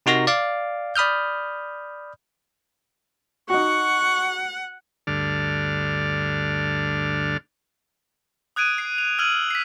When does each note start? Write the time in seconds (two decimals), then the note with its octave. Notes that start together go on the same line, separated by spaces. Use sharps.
0.06 C3 D#4 F#4 A#4 A#6
0.27 D5 F5 D6
0.96 D5 B5 D#6 F6 G6
3.50 D#4 F#4 F#5 C#6
5.07 D2 G2 D3 D5 F6
8.56 D#6 F#6 G#6 D7 D#7
8.78 C7
8.98 F7
9.19 E6 F6 G#6 D#7 F#7
9.51 B6 C7